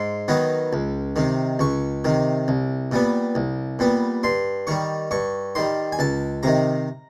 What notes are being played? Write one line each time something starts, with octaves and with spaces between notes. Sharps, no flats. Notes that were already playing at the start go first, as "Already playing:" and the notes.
Already playing: G#2 C6
D#3 F#3 B3 D#4
C#2
C3 D#3
C#2 C#6
C3 D#3
C2
A#2 G3 B3
C2
A#2 G3 B3
G2 C6
D#3 G3 C#6
G2 C#6
D#3 G3 C6
G#5
C#2 A5
C3 D#3 A#5